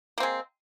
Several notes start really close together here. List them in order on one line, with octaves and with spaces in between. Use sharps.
A#3 C4 G#3